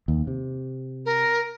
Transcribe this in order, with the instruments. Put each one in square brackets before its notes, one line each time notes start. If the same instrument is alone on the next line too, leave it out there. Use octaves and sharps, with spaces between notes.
[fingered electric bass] D#2
C3
[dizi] A#4